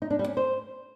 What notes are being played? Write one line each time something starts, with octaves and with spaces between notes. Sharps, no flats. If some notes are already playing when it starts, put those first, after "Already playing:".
D#4
D4
G3
C#4
C5